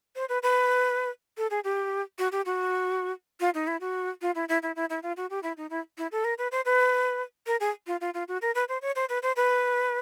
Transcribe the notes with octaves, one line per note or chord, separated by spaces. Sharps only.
C5
B4
B4
A4
G#4
G4
F#4
G4
F#4
F4
D#4
E4
F#4
F4
E4
E4
E4
E4
E4
F4
F#4
G4
E4
D#4
E4
E4
A4
A#4
B4
C5
B4
A#4
G#4
F4
F4
F4
F#4
A#4
B4
C5
C#5
C5
B4
C5
B4